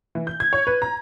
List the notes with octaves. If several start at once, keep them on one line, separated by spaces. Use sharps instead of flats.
E3
G6
G#6
C#5
B4
A#5